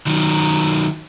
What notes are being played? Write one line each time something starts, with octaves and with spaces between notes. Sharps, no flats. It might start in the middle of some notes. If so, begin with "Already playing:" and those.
D#3 F#3